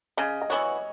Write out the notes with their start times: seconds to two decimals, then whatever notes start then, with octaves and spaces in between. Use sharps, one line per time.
0.17 C#3 D#5
0.42 D#5
0.50 E3 B3 F#4 C#5